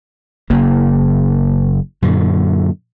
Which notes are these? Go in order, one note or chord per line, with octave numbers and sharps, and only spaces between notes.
F#1 C#3 A#3
F#2 A#2 D3